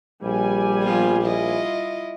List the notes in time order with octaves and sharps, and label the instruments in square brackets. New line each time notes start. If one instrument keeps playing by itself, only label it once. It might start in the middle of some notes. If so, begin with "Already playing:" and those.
[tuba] A#1 [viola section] G3 G#5
[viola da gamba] F3 B3 F4
E4 F4 D#5